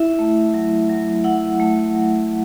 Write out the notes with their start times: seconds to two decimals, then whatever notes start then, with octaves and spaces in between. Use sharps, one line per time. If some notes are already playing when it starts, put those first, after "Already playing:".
Already playing: E4 E5
0.19 A3
0.54 F#3
0.90 F#3
1.24 E4 F#5
1.60 A3
1.95 F#3